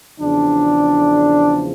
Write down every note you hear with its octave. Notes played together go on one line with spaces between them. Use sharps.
E2 C#3 F3 D4